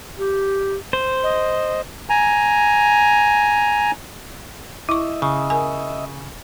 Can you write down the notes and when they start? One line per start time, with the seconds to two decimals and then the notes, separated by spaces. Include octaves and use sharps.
0.18 G4
0.93 C5
1.23 D#5
2.10 G#5 A#5
4.89 E4 D#5 E5 C#6
5.22 C#3
5.50 A#4 G#5